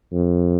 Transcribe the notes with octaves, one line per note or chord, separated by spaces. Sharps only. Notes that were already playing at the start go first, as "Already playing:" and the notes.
F2